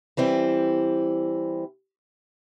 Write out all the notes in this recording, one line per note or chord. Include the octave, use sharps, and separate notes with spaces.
E3 G3 C4 E4